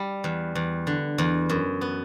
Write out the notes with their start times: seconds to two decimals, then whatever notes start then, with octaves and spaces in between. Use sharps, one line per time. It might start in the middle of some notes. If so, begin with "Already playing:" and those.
Already playing: G3
0.24 E2
0.55 E2
0.87 D3
1.18 E2
1.50 F#2
1.81 B3